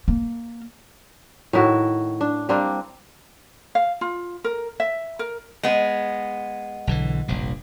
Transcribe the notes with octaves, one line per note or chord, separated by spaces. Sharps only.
A#3
A2 D#3 E4 F#4
D4
G3 A#3 C4 D4
F5
F4
A#4
E5
A#4
G#3 B3
B1 D3 E3
F1 A#1 G2